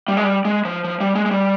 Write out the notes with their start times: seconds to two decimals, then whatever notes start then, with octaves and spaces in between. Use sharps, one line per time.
0.08 G3
0.17 G#3
0.24 G3
0.45 G#3
0.65 F3
0.84 F3
1.00 G3
1.15 G#3
1.26 G#3
1.31 G3